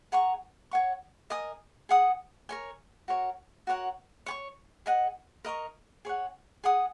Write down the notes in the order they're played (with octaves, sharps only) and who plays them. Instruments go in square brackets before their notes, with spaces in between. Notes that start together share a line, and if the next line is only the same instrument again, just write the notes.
[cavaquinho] G#4 F#5 A#5 C#6
C#5 F#5 C#6
A#4 D#5 G#5 D#6
G#4 F#5 D#6
A#4 C#5 G#5
F#4 A#4 C#5
F#4 A#4 C#5 F#5
C#5 G#5 C#6
G#4 D#5 F#5
A#4 D#5 A#5 C#6
G#4 C#5 F#5
G#4 F#5 D#6